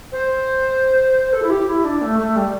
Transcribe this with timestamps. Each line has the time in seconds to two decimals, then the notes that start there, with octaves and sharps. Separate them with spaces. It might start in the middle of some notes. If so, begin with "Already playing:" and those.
0.12 C5
1.33 A4
1.42 E4
1.50 G4
1.67 E4
1.84 D4
2.01 A3
2.19 A3
2.36 G3